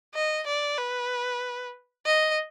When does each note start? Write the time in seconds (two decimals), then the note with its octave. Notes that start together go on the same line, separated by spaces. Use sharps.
0.14 D#5
0.47 D5
0.78 B4
2.06 D#5